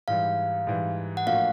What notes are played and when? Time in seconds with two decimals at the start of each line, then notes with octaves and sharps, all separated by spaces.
0.08 G#2 E3 G3 F5
0.67 G#2 E3 G3
1.17 F#5
1.26 A2 F3 A#3 D4 F#4 F5